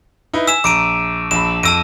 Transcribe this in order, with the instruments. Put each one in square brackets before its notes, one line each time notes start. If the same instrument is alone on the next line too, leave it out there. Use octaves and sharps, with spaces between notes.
[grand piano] D#4 E4 B4
[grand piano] G#5 B6 [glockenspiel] E6 E7
[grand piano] A#1 A#5 [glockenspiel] D6 D7 D#7
[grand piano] A#1 B5 [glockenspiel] E7
[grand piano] F2 A#6 D7 [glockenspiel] A5 E6 D#7